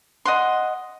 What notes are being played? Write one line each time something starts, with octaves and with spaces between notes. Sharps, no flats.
D#5 F#5 C6